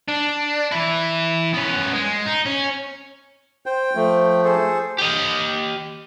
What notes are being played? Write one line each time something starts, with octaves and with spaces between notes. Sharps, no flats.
D4
E3 E4
B3 C#4
G#3
D#4
C#4
C5 G5
F3 A3
G#4 A4 C5
G4 D#5